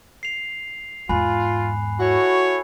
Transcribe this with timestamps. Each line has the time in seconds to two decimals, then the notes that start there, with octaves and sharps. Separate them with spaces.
0.23 C7 F7
1.09 E2 G#2 F4 G#5 B5 F#6
2.00 E4 F#4 A4 C#5